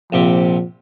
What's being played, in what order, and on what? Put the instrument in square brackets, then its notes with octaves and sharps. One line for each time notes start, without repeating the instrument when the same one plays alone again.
[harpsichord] A#1 C3 G4 [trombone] F3